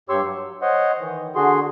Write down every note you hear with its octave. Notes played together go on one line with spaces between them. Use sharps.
G2 G4 C#5 C6 C#6 E6
F#3
C5 C#5 D#5 F#5 C6
D#3 E3
D3 F#4 G#4 C6